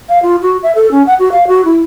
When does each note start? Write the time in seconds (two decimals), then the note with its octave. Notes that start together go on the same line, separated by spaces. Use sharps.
0.09 F5
0.23 F4
0.42 F#4
0.63 E5
0.75 A4
0.91 C#4
1.07 F#5
1.19 F#4
1.32 F5
1.47 F#4
1.65 E4